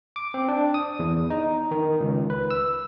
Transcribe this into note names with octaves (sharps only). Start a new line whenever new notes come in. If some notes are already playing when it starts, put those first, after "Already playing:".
D6
C4
D4
D#6
E2
D#4
D#3
C#2
B4
E6